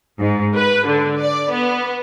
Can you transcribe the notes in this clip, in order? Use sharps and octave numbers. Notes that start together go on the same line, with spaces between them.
G#2
B4
D3
D5
B3